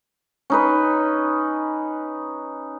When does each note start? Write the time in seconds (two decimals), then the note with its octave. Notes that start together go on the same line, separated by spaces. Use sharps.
0.50 C#4 D#4 B4